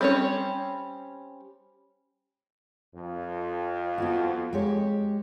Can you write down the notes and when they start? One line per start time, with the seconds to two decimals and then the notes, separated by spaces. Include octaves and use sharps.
0.01 G3 C4 C#4 G#4 C#5
2.94 F2
3.98 B3 F4 F#4
4.53 G#3 G4 C#5